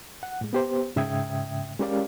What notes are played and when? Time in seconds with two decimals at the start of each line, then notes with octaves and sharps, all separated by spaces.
0.23 F#5
0.41 A2 G#3
0.53 B3 G4 C5
0.96 G#2 C#3 E5 G5 D#6 G#6
1.80 G#3 C#4 G4 A#4 D5 F5